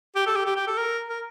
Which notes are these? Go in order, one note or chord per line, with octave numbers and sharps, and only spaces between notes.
G4
A4
G4
G4
G4
A4
A#4
A#4